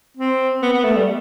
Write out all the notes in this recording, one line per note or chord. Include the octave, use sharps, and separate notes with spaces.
C4
B3
B3
A3
G3